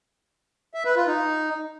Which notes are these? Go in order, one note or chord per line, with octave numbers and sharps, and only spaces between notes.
E5
B4
F4
D#4